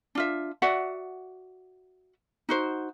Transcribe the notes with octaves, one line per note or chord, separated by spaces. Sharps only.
D4 F4 E5
F#4 D5 E5 F#5
D#4 F#4 C5